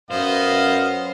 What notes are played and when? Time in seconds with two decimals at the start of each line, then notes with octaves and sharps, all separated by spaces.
0.11 F#2 B3 C5 D#5 F5